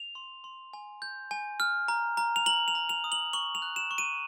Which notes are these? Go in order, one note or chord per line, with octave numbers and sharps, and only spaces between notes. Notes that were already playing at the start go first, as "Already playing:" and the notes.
Already playing: F7
C6
C6
G#5
G6
G#5
F6
A#5
A#5
F7
A#5 F#7
F7
A#5
F7
D#6
F#7
C#6 F#7
F7
F#6
E7
C#6
D#7